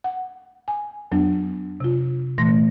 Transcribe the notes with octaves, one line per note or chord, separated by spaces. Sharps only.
F#5
G#5
F2 F#3 B3 D4
C3 F4
A#2 E3 A3 C6 A#6